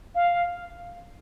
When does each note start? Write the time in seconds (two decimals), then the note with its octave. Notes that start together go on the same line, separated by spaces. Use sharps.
0.15 F5